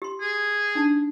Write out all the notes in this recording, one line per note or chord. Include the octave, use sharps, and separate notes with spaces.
G4 C6
G#4
D4 D#4